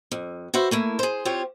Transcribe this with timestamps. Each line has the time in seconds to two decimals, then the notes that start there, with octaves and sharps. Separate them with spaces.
0.12 F2
0.54 F#4 B4 C5 E5
0.71 A3 A#3 E4
0.99 G#4 C5
1.25 C4 F4 G4 C5 C#5